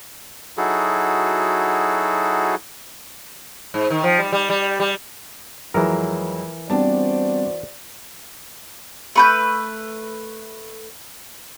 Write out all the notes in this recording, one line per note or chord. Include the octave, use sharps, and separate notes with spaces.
F#3 D#4 E4 F#4 G#4 A4
G#2
D#3
F3
G3
G3
G3
G3
F2 E3 F#3 G#3 A#4
G3 B3 C4 D4 F#4 C5 D5 A5
A3 B4 G6